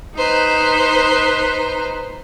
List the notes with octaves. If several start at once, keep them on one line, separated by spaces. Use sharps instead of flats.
D#4 B4 C5 A#5